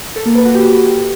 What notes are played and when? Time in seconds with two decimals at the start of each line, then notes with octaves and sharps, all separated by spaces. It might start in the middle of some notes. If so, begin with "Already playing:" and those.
0.16 A4
0.26 A#3
0.35 B4
0.45 F#4
0.55 G4